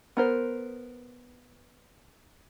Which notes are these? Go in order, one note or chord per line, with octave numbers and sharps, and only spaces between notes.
B3 A#4 C5